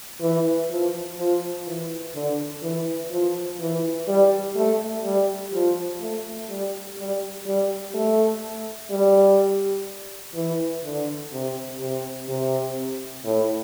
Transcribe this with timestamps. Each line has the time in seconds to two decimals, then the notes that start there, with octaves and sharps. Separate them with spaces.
0.21 E3
0.70 F3
1.18 F3
1.67 E3
2.15 D3
2.63 E3
3.11 F3
3.60 E3
4.08 G3
4.56 A3
5.04 G3
5.53 F3
6.01 A3
6.49 G3
6.98 G3
7.46 G3
7.94 A3
8.90 G3
10.35 E3
10.84 D3
11.32 C3
11.81 C3
12.28 C3
13.25 A2